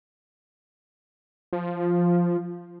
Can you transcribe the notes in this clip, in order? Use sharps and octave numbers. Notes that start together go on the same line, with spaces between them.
F3